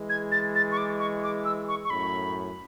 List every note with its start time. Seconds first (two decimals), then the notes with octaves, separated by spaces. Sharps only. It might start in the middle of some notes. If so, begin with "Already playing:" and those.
Already playing: E3 G#3
0.09 G#6
0.32 A6
0.55 A6
0.71 C#6
0.77 D6
0.99 C#6
1.23 D6
1.45 E6
1.68 C#6
1.84 C#6
1.90 F#2 A2 B5